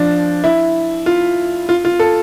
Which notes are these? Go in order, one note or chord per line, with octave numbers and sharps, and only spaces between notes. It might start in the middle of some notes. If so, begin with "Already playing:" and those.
Already playing: F3 D4
E4
F4
F4
F4
A4